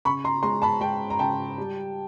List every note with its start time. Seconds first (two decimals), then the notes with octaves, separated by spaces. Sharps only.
0.05 C#3 B5 C#6
0.24 A#5 C6
0.43 G#3 A#5 C6
0.62 A5 B5
0.81 G#3 G5 A5
1.10 A#5
1.19 C#3 G5 A5
1.58 G3